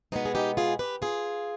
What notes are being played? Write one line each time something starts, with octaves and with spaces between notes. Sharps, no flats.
B2 G#3 B3 C4 D#4
G#4
D#4 G4
F4 G#4
G4 B4
F4 G#4